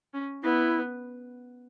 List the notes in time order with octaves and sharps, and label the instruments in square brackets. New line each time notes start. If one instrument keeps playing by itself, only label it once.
[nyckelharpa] C#4
[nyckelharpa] B3 [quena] E4